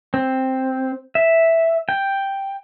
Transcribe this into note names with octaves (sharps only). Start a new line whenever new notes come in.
C4
E5
G5